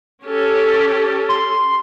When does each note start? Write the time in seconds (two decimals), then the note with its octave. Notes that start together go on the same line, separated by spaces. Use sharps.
0.25 C#4 G4 A4
1.29 C6